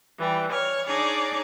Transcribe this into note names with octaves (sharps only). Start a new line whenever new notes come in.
E3 G3
C#5 F6
D4 D#4 G#4 C#5 D5